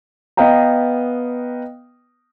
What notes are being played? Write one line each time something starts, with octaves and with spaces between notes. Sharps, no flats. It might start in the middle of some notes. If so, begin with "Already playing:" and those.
B3 B4 D#5 F5 G5 A#5